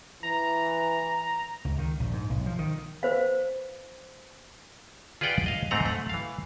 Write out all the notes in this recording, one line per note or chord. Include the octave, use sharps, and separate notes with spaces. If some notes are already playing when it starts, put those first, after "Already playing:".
E3 A#5
C#2
D#3
A#1
G#2
B1
F3
D#3
B4 C5 F5
F4 G#4 B4 D5 F#5 G5
G#4 D#5 F5
G#2 A3 C4 F#5 A#5
A3 F#5
E3 F5